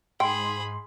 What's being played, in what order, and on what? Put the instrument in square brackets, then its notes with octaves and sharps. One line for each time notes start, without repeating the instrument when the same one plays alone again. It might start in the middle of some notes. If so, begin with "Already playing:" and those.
[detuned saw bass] G#2 [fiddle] G#4 B5 [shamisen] G5 [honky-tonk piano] C6